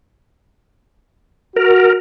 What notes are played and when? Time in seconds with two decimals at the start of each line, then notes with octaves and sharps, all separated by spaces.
1.56 F#4 A#4